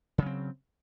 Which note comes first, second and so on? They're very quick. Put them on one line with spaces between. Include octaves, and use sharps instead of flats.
C#3 F#3 C4